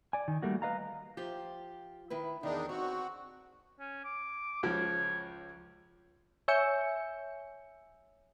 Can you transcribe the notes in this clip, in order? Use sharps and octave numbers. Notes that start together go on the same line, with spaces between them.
D5 G#5
D#3
G3 A3 A#3 F#4
B4 D#5 F5 A#5
F3 F4 G4
D#3 E4 B4
E2 D#3 D4 D#4 A#4
C4 F#4 C#5
C#4
D6
C#2 F3 C#5
C#5 E5 G#5 E6 G6 C#7